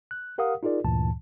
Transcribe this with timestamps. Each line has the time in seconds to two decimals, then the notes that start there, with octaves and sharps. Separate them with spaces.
0.11 F#6
0.38 G4 A#4 F5 F#5 D#6
0.63 D#4 F4 G#4 A#4 D5
0.85 D2 G2 A#2 E3 A5